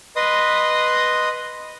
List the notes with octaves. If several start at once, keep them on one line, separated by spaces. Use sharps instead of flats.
B4 D#5 C6 D#6